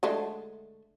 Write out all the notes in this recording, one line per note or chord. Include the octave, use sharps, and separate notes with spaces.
D3 G#3 A3